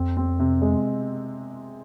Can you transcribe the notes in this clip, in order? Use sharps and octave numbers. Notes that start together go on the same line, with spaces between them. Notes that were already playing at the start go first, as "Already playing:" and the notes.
Already playing: F2 C4
C4
C3
G#3